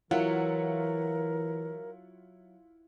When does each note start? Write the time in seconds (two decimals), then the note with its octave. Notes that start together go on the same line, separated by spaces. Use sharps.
0.11 E3 F#3 E4 F4 A#4 F#5